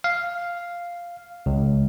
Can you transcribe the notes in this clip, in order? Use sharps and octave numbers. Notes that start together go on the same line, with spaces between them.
F5
C#2